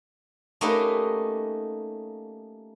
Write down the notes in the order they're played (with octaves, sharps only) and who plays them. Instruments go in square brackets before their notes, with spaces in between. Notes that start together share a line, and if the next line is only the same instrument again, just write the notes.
[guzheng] A3 A#3 C#4 D#4 G4 B4